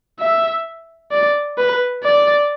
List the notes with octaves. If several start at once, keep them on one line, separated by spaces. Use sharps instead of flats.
E5
D5
B4
D5